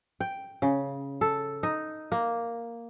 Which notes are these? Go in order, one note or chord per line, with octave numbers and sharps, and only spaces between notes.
G5
C#3
A4
D#4
A#3